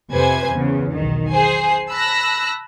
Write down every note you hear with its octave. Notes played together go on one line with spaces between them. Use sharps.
F2 C3 B4 C5 G#5 G#6
E2 C#3
B1 D#3
G#4 C5 G#5 C7
A5 B5 E6 F#6 A#6